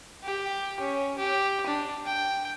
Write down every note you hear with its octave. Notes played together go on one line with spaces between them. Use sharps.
G4
C#4
G4
D4
G5